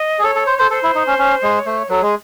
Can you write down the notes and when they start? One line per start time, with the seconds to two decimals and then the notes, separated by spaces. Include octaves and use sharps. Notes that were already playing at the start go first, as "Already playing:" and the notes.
Already playing: D#5
0.19 G#4
0.23 A4 C#5
0.36 A4
0.47 C5
0.59 A4 C5
0.71 A4 C5
0.83 E4
0.95 D#4
1.07 C#4
1.19 C#4
1.43 G#3
1.59 C#5
1.66 A3 C5
1.78 C#5
1.89 F#3 A4
2.01 G#3 G#4